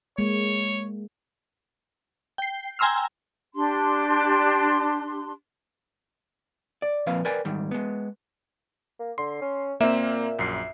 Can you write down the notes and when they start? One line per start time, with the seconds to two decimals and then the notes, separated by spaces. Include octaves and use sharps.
0.19 G#3 A#3 C#5
2.38 G5 C7
2.79 G5 G#5 A#5 C6 E6 F6
3.55 D4 G4 C6
6.82 D5
7.06 A#2 F3 C4 B4 F5
7.25 A#4 B4 D5 G5 G#5
7.45 G#2 D#3 G3
7.71 G#3 B3
8.99 A#3
9.18 D3 C6
9.41 C#4
9.81 A#2 A#3 C4 E5
10.39 A#1 F#2 C7